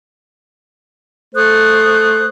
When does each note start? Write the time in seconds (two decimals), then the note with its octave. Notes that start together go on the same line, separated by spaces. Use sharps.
1.35 A3 C5 D#6 F#6